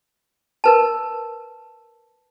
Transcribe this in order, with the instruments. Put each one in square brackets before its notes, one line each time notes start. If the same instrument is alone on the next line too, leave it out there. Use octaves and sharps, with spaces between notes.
[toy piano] A#4 B4 A5